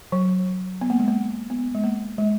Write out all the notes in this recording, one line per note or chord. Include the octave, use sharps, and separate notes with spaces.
F#3
B3
A#3
G#3
A#3
B3
G#3
A#3
G#3